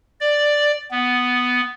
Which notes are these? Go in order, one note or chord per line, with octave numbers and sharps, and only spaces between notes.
D5
B3